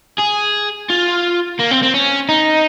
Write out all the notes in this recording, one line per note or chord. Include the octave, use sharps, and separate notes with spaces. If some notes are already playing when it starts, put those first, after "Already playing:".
G#4
F4
A#3
C4
C4
C#4
D#4